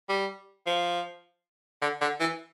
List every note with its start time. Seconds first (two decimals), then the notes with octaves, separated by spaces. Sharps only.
0.09 G3
0.66 F3
1.81 D3
2.01 D3
2.20 E3